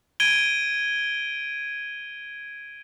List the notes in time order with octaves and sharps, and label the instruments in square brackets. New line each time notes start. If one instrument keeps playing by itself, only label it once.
[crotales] G#6 D7 D#7 G7